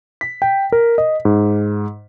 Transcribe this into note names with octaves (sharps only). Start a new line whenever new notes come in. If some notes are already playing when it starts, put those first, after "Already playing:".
B6
G5
A#4
D#5
G#2